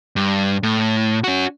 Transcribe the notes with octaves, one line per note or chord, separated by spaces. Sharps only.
G2
A2
C#4 F#4